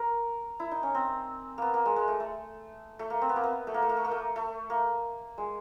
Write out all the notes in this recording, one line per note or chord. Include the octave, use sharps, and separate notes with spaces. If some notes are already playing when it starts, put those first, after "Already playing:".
Already playing: A#4
E4
D#4
C#4
C4
A#3 B3
A#3
G#3
G#3
A3
A3
A3
A#3
C4
B3
A#3
B3
A3
A#3
A3
A#3
A3
A#3
A3
A3
A#3
G#3